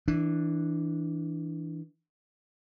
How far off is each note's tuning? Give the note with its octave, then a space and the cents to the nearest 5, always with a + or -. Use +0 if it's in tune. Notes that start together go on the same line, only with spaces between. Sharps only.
E3 -10 D4 +0